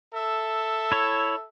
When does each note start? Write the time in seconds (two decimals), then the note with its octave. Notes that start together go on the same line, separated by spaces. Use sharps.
0.12 A4 E5
0.92 E4 C#5